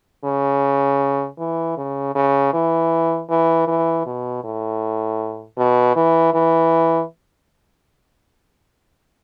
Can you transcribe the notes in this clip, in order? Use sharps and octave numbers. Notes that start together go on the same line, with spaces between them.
C#3
E3
C#3
C#3
E3
E3
E3
B2
A2
B2
E3
E3